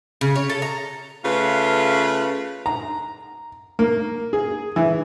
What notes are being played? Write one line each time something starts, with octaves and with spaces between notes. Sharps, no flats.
C#3
C#5
A4
A#5
C#3 A3 F4 B4
A#5
A#3
G#4
E3